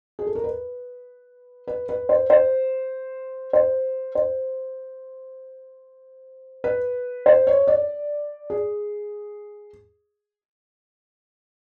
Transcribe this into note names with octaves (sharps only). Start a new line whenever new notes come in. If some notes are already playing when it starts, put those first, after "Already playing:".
G#4
A4
A#4
B4
B4
B4
C5
C5
C5
C5
B4
C5
C#5
D5
G#4